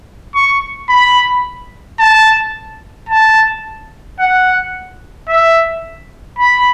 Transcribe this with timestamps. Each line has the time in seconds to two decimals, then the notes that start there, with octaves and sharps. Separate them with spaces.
0.35 C#6
0.89 B5
2.00 A5
3.09 A5
4.19 F#5
5.29 E5
6.39 B5